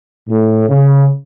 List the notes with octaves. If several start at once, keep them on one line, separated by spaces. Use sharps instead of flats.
A2
C#3